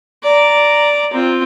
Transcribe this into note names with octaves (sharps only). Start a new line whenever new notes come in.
D5 A#5
C4 F4